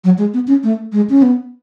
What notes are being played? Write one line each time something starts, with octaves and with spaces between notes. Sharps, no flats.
F#3
G#3
B3
C#4
A3
G#3
C#4
B3